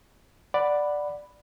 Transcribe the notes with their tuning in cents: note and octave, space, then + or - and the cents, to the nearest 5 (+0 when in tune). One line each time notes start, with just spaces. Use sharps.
D5 +5 F#5 +0 B5 +0